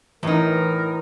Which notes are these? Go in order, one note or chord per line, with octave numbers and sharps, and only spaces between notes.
A2 E3 D#4 A#4